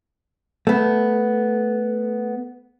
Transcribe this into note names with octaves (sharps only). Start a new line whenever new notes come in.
A3 B3